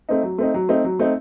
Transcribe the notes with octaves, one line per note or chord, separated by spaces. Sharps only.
A3 C4 D#4
F#3
A3 C4 D#4
F#3
A3 C4 D#4
F#3
A3 C4 D#4